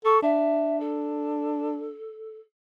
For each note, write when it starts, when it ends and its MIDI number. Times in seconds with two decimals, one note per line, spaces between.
0.05 0.20 69
0.05 0.18 85
0.23 1.95 62
0.23 0.77 76
0.80 2.38 69